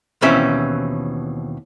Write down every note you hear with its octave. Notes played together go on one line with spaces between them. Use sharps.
D#2 B2 E3 C4 C#4 E5